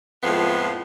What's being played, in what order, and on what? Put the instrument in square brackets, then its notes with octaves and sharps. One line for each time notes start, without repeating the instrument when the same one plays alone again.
[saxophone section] F2 A2 F3 G#3 B3